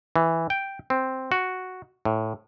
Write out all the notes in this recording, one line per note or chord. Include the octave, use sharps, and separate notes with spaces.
E3
G5
C4
F#4
A2